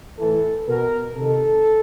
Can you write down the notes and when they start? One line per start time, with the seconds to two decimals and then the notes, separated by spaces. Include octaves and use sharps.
0.19 A2 E3 A4
0.67 B2 A#4
1.16 C3 D#3 A4